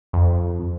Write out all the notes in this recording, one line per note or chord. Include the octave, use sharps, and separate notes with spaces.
F2